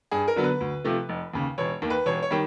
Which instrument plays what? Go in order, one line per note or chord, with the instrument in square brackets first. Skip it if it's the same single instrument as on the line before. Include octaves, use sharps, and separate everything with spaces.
[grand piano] G2 G#4
A#4
D3 F#3 B3
B4
D2
C3 F3 A3
F1
D#2 C#3
E1 C#5
D#2 D#3
B4
E1 C#5
C#5
D#3 G3